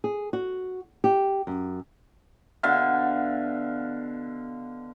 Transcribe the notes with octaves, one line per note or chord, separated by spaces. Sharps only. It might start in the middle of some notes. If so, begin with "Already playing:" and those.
G#4
F#4
G4
F#2
B2 D3 E5 F5